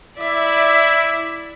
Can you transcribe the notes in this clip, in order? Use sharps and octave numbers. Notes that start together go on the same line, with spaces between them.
E4 D5 E5